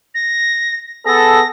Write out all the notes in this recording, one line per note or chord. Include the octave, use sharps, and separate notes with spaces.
A#6
B3 G#4 A4 A#6